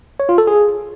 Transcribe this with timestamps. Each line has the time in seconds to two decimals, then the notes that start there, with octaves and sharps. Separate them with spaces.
0.20 C#5
0.29 F4
0.38 A4
0.47 G#4